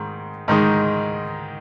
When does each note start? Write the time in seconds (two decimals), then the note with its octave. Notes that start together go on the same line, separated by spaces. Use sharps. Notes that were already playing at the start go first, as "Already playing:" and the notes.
Already playing: G#2 D#3 G#3 D#4
0.48 G#2 D#3 G#3 D#4